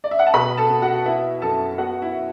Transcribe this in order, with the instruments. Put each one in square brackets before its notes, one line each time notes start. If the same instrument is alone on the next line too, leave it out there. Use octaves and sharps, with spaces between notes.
[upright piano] D5
E5
F#5
A5
B2 B4 B5
A4 A5
B2
F#4 F#5
B3 E4 E5
F#2 A4 A5
B3 F#4 F#5
E4 E5